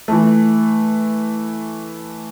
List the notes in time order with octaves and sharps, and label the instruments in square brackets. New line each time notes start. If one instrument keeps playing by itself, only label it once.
[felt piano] E3 A3